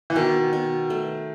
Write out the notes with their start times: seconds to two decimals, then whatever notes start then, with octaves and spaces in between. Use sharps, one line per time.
0.10 E3
0.16 B2 D#3
0.53 B2
0.90 A3